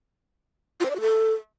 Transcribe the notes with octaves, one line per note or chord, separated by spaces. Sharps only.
F4
C5
D5
F#4
A4